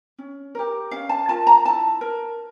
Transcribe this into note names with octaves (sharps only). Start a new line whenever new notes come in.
C#4
G4 A#4
C#4 F5
A5
F4 A#4 A5
A#5
E4 A5
A#4